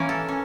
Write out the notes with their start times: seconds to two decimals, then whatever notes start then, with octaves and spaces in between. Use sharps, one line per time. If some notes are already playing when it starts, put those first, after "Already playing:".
Already playing: E3 A#3 C#4
0.09 A4
0.28 C#4